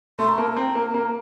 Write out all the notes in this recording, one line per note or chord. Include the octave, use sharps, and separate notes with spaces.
A3 C6
A#5
A#3 A5
A#5
C4
A#3
A#3